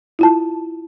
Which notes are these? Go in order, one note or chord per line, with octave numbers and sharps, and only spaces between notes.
E4 F4 A5